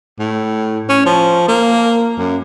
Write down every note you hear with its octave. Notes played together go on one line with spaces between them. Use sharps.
A2
C#4
F3
A#3
F#2